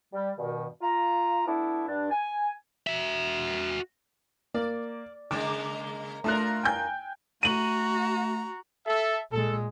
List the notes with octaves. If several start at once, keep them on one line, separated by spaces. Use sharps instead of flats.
G3
G2 B2 D#3
F4 A#5
A3 B3 D4 E4
G2 D4
G#5
F#4 E5
A#3 D5
C#3 G#3 A#3 D6
A3 D4 F4 A#4 F#6
G5 G#5 G6
A3 F#4 A#5 D#7 F#7
A4 E5
A#2 G#3 A4